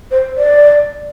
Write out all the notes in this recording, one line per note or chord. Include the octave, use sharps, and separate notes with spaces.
C5
D5